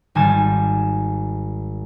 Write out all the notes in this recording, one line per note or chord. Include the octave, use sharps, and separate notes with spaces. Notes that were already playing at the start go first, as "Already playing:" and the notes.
G#1 G3 G#5 A6 E7